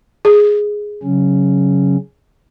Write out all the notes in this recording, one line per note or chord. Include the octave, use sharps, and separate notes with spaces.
G#4
C#3 F#3 C#4